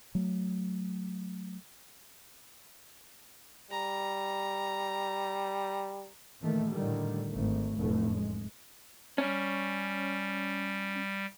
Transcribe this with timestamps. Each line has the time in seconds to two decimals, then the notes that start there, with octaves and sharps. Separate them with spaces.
0.15 F#3 A3
3.71 G3 A#5
6.41 A#2 D#3 E3 A3
6.71 A2 D3 D#3 G3
7.33 G#1 G#2 A3
7.80 F1 F#2 A2 A3
8.16 G#3
9.18 G3 C#4